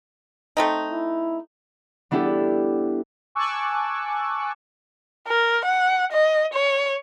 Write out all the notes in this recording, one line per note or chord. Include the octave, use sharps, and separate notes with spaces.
A3 C4 D#4
E4
G3 B3 D4 E4 G4 A4
G#5 A5 C#6 D6 E6 F#6
A#4
F#5
D#5
C#5